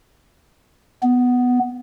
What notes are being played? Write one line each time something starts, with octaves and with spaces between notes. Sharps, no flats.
B3